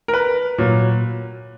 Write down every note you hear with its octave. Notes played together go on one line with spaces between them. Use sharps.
A#4
B4
A#2 F#3